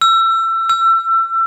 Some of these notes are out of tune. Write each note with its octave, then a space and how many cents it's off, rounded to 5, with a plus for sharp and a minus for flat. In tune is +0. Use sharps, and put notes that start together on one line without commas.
E6 +25
E6 +30